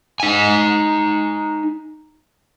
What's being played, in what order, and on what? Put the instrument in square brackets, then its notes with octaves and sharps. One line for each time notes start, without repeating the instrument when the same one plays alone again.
[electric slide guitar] D#4 G#5